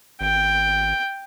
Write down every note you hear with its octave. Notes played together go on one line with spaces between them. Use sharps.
G#1 G5